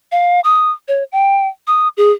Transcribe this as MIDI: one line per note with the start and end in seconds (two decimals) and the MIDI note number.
0.12 0.41 77
0.44 0.71 87
0.88 1.03 73
1.12 1.47 79
1.67 1.88 87
1.97 2.12 68